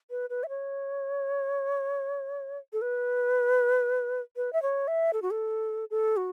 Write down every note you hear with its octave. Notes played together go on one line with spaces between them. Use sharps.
B4
B4
E5
C#5
A4
B4
B4
E5
C#5
E5
A4
F#4
A4
A4
F#4